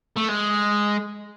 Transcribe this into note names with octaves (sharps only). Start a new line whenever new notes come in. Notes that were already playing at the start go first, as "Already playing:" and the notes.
A3
G#3